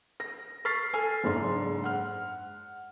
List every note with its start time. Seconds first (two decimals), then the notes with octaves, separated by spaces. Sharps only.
0.20 A#6
0.65 C#6 F6 A6 B6 C7
0.93 A4 G#5 F6 C7
1.24 F#1 G#2 D4 C6
1.84 F#5 F6